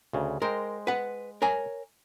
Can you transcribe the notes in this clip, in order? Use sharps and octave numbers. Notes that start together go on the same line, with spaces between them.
D2 C#3
G#3 A#4 C5 G5
B4 F#5
A#4 C#5 G#5